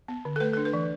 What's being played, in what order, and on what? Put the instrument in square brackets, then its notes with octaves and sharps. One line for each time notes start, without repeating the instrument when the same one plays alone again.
[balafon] B3
D3
A4
A3 B4
D4 A4
B4
E3